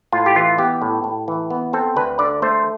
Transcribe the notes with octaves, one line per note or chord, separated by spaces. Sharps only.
A2 F4
G4
E3 F4
B3 G4
A2
A2
E3
B3
C4 A4
D2 B4
D3 D5
A3 C5